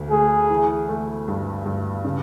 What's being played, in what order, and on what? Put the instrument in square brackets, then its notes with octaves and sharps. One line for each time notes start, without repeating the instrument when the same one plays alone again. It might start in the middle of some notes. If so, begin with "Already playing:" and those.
Already playing: [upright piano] D2
[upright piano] A3 [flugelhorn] G#4
[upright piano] E3
A3
G2
G2
C#3